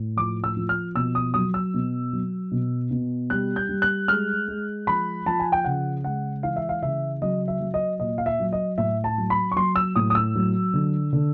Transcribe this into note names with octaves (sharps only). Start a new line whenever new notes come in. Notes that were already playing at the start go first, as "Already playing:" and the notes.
Already playing: A2
F3 D6
E6
F3
F6
B2 E6
D#6
F#3 D#6
E6
B2
F#3
B2
B2
G3 F#6
G6
G3
F#6
G#3 F6
G#3
F3 B5
F3 A5
G#5
G5
C#3 F#5
G#3 F#5
E3 F5
E5
F5
C#3 E5
F#3 D#5
E5
F#3
D#5
A#2 D#5
F5
E5
F#3
D#5
A2 E5
A5
F#3
B5
C#6
F#3 C6
E6
A2 D#6
D#6
E6
F#3
D3
D3